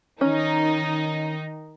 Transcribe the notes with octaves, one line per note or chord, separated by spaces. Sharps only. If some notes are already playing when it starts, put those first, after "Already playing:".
D#3 C#4 D#4